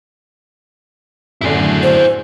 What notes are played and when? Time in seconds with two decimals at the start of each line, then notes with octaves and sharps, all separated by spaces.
1.41 F#2 A2 D3 E4 G#4
1.83 C5